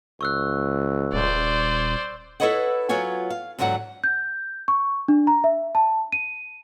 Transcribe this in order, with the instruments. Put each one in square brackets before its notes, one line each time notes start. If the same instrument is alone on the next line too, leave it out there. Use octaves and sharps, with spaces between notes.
[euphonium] C#2 [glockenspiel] C#6 E6 F#6
[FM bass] D#1 [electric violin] C5 D5
[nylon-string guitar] E4 A4 B4 C#5 D#5 F#5
F#3 B3 F4 C#5 G#5
F5
E2 G#2 D3 F#3 F#5
[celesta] G6
C#6
D4
A#5
E5
A5
D#7